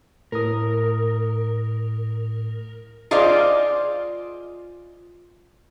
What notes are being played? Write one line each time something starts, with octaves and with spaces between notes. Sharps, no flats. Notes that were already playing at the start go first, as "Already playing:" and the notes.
A2 A#4 D#6
F4 G#4 C5 D5 D#5 F5